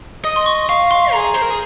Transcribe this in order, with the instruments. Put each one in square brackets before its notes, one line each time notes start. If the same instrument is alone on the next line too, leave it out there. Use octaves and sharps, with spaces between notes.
[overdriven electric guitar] D#5 [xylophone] D#6
[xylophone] C6
C#6
[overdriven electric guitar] F5 [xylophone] C#6
[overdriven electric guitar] F5 [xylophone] C6
[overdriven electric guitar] G#4 [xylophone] A#5
[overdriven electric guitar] C5
A#4
G#4